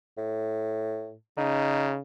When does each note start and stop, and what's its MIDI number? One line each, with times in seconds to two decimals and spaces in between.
0.17 1.15 45
1.37 2.00 49
1.37 1.94 63